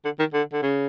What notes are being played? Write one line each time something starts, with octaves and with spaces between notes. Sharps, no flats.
D3
D#3
D3
D3
C#3